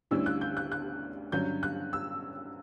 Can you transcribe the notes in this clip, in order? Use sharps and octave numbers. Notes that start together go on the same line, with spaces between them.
D2 D3 G3 C#4 E4 E6
F#6
G6
F#6
F#6
G2 D3 F#3 C#4 G6
F#6
E6